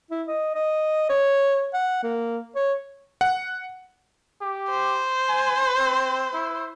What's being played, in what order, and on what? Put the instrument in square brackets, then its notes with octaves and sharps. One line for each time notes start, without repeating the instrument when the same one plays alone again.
[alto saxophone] E4
D#5
D#5
C#5
F#5
A#3
C#5
[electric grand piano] F#5
[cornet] G4
[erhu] C5
[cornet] G#5
C4
E4